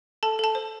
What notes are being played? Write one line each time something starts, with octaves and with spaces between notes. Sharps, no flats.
A4 A5
A4 A5
C5